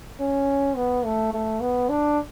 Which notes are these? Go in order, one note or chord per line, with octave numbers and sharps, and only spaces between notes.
C#4
B3
A3
A3
B3
D4